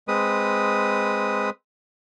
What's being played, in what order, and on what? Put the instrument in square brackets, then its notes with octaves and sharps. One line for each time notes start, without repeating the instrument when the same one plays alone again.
[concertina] G#3 C4 B4 D#6